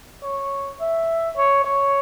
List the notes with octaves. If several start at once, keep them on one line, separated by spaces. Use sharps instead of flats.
C#5
E5
C#5
C#5